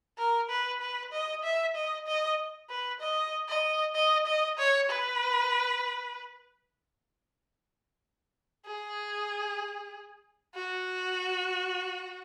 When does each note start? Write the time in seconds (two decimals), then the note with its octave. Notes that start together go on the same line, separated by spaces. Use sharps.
0.18 A#4
0.50 B4
0.81 B4
1.12 D#5
1.43 E5
1.75 D#5
2.07 D#5
2.70 B4
3.00 D#5
3.48 D#5
3.95 D#5
4.26 D#5
4.58 C#5
4.90 B4
8.67 G#4
10.55 F#4